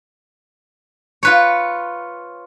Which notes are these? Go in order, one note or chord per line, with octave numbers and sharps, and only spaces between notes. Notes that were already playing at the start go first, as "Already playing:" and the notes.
F4 B4 C#5